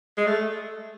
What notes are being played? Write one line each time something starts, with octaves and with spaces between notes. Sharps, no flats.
G#3
A3